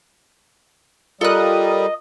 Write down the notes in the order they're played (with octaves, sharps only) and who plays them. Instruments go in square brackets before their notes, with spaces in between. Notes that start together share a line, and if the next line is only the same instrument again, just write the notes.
[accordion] G3 [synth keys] F4 A#4 D#6 [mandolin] A4 F#6 [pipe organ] D#5